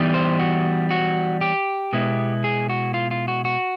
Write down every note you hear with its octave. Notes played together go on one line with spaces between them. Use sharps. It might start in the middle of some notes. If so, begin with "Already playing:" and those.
Already playing: E3 G3 B3 D#4
C5
F#4
F#4
G4
B2 G#3 B3 E4
G#4
F#4
F4
F4
F#4
F#4